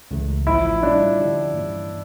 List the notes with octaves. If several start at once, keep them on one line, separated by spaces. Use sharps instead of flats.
C#2 C#3 E3 A3
A1 A2 F3 E4
A2 G3 C#4 D4 F4
D3 F3 C#4 E4 G4
G2 E3 A#3 C#4